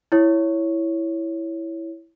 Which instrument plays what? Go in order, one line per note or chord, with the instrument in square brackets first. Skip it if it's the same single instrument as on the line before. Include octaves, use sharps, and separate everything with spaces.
[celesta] E4 C#5